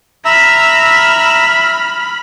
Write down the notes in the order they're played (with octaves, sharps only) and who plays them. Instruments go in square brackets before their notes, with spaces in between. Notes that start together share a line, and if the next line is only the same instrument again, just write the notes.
[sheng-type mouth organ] E5 A#5 E6 [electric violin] B5 F6